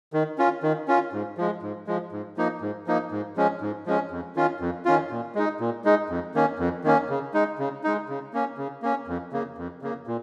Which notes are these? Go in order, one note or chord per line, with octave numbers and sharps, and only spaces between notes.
D#3
C#4 F4
D#3
C#4 F4
G#2
F3 G#3
G#2
F3 G#3
G#2
F3 A#3 D#4
G#2
F3 A#3 D#4
G#2
F3 G#3 C#4
G#2
F3 G#3 C#4
F2
D#3 C#4 F4
F2
D#3 C#4 F4
A#2
G#3 D#4
A#2
G#3 D#4
F2
D#3 A#3 C#4
F2
D#3 A#3 C#4
C#3
G#3 D#4
C#3
G#3 D#4
C#3
A#3 C#4
C#3
A#3 C#4
F2
C#3 A#3
F2
C#3 A#3
A#2